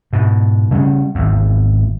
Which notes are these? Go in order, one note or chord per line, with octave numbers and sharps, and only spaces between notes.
G#2 B2
C#3 G3 A3 C#4
G#1 E2